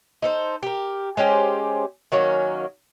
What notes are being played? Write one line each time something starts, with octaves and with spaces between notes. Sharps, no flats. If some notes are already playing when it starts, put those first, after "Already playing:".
D#4 A4 C5
G4 A#4
G#3 C#4 G4 C5
D#3 F#3 A#3 C#4